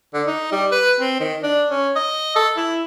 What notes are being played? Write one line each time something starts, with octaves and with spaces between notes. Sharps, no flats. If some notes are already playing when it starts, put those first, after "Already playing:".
D3
D#4
G3
B4
C4
D#3
D4
C#4
D#5
A4
E4